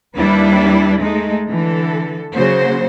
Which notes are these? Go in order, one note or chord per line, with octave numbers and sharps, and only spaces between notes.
D#2 G3 D4 E4 B4
G#3 A3 D#4
D3 E3 A4
C#3 F#3 A#3 F#4 C5